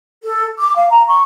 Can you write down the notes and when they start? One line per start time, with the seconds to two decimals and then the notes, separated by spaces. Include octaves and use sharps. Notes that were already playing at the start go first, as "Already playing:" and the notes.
0.23 A4
0.59 D6
0.76 F5
0.88 A#5
1.06 C#6